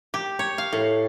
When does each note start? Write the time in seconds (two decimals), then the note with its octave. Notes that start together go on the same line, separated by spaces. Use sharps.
0.14 G4
0.39 C#5
0.58 F5
0.72 A2